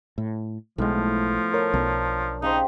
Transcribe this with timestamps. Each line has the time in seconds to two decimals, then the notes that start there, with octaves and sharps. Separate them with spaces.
0.18 A2
0.78 B1 A2 F3 G#3 B3
1.54 A4 A#4 C#5
1.74 B1 D4 A#5
2.42 C#3 D#4 G4 C5